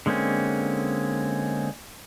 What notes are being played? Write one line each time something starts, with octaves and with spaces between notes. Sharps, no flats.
D3 G#3 A#3 C4 C#4